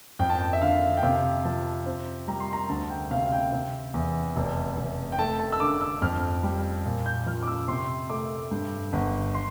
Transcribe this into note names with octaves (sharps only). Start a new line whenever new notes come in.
F2 G5
A5
G5
E5
D3 F5
G5
C3 F5
F3 A5
C4
G3 A#5
C6
A#5
D2 A5
G5
C3 F5
F5
G5
C3
E2
F1
F1
G5
A3 A5
A5
E6
D3 D6
E6
F2 F6
G3
A#2
G6
F3 F6
D6
E6
C3 C6
A3 D6
G2
G1
C6